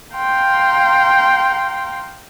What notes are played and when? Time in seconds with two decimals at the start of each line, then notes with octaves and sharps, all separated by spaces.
0.14 F5 G5 A#5 C6